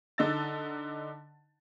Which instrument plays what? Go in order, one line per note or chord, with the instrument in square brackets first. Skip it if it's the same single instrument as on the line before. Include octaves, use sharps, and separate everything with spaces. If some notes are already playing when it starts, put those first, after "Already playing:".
[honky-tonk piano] D3 D#4 E6 A6